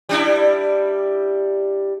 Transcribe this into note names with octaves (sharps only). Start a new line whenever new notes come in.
G3 D4 E4